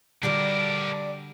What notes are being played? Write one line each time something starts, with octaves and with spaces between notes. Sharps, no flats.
D3 G3 D4 F#4 G4 A#4 D5